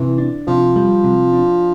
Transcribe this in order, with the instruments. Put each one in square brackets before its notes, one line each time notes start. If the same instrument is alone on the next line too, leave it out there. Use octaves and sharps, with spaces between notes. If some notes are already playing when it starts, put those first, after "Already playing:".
Already playing: [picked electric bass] C3 [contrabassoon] E3
[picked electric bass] D4
[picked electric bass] C3 [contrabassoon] F3
[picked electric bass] G3
C3
D4